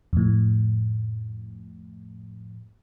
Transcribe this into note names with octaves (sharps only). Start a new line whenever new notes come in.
F2 A2